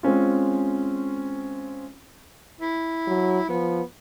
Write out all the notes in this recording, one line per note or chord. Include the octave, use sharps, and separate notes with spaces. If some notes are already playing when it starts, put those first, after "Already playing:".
G#3 C4 C#4 F4
E4
F#3
F3 B3